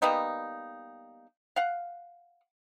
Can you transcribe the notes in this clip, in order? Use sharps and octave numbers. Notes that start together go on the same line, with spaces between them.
G3 A#3 B3 D#4
F5 F#5